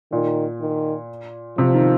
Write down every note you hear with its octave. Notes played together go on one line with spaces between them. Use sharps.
A#2 D#3
D#3
C3 F3
D#3